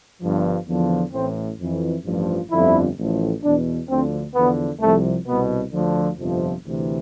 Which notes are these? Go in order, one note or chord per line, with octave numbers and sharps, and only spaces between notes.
G1 G2 F3
E2 D3 F3
A1 A2 E3 C4
F2 E3
A1 G2 F3
G1 F2 D3 F3 E4
A1 A2 F3
E2 B2 D4
D2 D3 F3 C4
E2 D3 F3 B3
C2 C3 F3 A3
C2 B2 B3
D2 D3 F3
G1 F2 C3 F3
D2 C3 E3